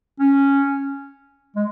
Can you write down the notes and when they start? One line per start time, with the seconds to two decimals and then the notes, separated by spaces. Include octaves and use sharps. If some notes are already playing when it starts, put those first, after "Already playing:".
0.20 C#4
1.56 G#3